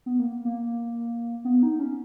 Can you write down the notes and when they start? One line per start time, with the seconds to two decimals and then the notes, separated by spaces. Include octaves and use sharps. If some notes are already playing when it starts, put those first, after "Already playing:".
0.06 B3
0.19 A#3
0.45 A#3
1.45 B3
1.63 D#4
1.79 C#4